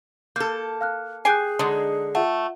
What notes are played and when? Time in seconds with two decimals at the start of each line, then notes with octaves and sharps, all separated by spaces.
0.36 A#3 A4 G6
0.81 F5 F6 F#6
1.25 G4 G#4 G5 G#5 F#6 G6 C7
1.59 D3 F#3 G#3 D4 D#4
2.15 A3 F4 E5 F#5